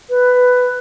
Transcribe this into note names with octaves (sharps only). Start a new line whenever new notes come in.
B4